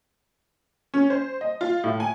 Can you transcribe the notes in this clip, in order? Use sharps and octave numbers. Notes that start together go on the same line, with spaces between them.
C#4
C5
D#5
F4
A2
G#5